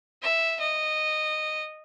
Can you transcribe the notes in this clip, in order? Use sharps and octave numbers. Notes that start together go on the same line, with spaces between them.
E5
D#5